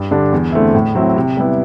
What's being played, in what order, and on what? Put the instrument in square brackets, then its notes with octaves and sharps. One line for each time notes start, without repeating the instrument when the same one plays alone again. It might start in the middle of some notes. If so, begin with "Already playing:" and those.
Already playing: [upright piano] G2
D3 G3 D4
E2
D3 A3 C4 E4
A2
F#3 C4 E4
C3
G3 B3 E4